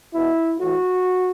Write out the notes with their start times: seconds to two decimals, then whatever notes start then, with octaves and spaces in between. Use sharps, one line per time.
0.14 B2 E4
0.59 A2 E3 F#4